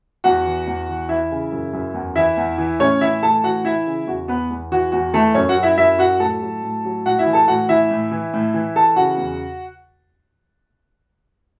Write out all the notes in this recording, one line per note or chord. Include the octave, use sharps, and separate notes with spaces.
E2 F#4 F#5
E3
E2
E3
E3 E4 E5
C#3
F#2
F#2
E2
E3 E4 E5
E2
E3
A2 C#4 C#5
E3 E4 E5
A2 A4 A5
E3 F#4 F#5
E3 E4 E5
C#3
E2 F#4
E2 B3 B4
E2
E3 F#4
E2 F#4
E3 A3 A4
F#2 C#4 C#5
F#4 F#5
F#3
E4 E5
F#2 E4 E5
F#3 F#4 F#5
A2 A4 A5
F#3
A2
F#3
A2 F#4 F#5
E4 E5
E3
A4 A5
A2 F#4 F#5
E3 E4 E5
A2
E3
A2
E3
E3 A4 A5
C#3 F#4 F#5
E2